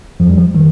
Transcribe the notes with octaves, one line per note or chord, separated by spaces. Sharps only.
F2 F3
G3
F3
D#3 G3